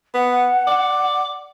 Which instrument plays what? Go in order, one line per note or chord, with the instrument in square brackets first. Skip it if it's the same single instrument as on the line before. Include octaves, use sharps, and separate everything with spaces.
[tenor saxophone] B3 [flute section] F#5
[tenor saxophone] D5